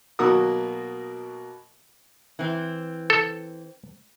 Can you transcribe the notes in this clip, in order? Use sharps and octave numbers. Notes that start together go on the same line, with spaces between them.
B2 F#3 A#3 F#4 D#6
E3 C4
A4